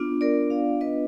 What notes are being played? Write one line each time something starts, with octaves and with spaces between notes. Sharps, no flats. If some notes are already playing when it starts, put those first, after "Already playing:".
Already playing: B3 D4 F4
A#4 D5
D5 F5
B4 D#5